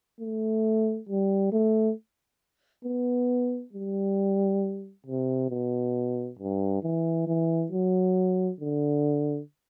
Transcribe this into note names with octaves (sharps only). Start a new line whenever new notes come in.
A3
G3
A3
B3
G3
C3
B2
G2
E3
E3
F#3
D3